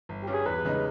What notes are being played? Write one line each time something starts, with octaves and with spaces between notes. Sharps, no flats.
G1
G4
G2 G3 C#4
G#4
E2 B4
C#3 G#3 D#4